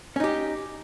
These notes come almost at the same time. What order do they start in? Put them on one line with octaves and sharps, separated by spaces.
C#4 D#4 G4